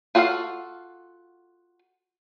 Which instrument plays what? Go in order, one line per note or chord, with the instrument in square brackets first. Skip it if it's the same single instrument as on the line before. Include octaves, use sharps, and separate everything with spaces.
[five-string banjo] F4 F#4 A4 D5 F5